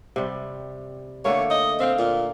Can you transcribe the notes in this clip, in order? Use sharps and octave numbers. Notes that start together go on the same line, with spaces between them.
C3 G3
D3 A3 A#3 C#5
D#5
C4 E5 F5 G5
A#2